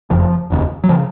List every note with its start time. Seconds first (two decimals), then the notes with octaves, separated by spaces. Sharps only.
0.10 F#1 F2 C#3 F3
0.50 F1 D#2 C#3
0.84 F#3
0.89 C#3 F3